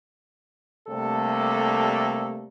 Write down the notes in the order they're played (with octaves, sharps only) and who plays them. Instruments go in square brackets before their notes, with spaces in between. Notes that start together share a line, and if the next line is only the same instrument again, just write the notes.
[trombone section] C3 G3 A3 A#3 D4 A4